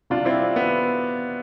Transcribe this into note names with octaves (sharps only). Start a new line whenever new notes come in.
C3 G3 D4 F4
C4 E4
B3